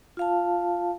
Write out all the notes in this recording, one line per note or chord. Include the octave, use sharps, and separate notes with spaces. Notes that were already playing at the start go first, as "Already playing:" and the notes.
F4 F5 A5